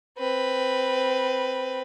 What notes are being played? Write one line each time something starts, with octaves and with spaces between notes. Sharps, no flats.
C4 B4